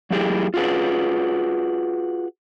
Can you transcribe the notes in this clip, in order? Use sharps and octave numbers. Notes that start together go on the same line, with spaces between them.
F#3 A3 A#3 E4 G4 G#4
F4 F#4 G#4 B4